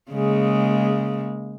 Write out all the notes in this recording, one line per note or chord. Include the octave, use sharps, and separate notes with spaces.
C#3 G#3 A#3